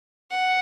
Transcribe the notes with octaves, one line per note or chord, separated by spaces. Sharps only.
F#5